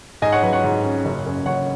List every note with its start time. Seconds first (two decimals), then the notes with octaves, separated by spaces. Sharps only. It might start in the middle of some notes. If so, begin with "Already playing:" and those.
0.22 G#2 D#5 G#5
0.32 C#5 F#5
0.42 F#3 B4 D#5
0.53 C#5 F#5
0.64 G#2
0.84 C#4
1.05 F#1
1.26 F#2
1.46 F#1 C#5 F#5